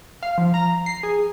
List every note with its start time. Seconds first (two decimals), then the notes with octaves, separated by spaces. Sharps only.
0.23 F5
0.38 F3
0.54 A#5
0.86 C7
1.03 G#4